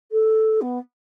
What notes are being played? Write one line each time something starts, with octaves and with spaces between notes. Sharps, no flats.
A4
B3